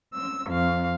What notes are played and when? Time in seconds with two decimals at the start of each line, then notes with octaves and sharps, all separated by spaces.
0.14 E6
0.51 F2 F5